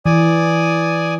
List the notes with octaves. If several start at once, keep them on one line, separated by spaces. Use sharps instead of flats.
E3 D5 G#5 D#6